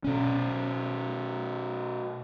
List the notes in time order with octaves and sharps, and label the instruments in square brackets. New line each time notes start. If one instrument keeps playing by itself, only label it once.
[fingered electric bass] B2 C#4